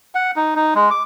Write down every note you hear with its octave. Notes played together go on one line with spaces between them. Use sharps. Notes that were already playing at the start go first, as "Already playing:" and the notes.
F#5
D#4
D#4
G#3
D6